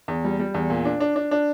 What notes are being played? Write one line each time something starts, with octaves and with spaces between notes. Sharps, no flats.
E2
G3
G3
E2
A#2
D4
D4
D4
D4